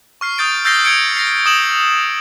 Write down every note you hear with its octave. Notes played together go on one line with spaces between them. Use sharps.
C#6 F6 C7
D#6 G6 A6 D7
E6 G6 A6 A#6 C7 G7
D#6 G#6 C#7 D7 G7
A#6 C7
D#6 E7 F#7